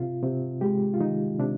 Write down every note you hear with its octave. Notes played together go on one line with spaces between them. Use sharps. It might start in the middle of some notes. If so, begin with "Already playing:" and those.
Already playing: C3 F4
C3
G#3 G4
F4
D#3 D#4
C3 D4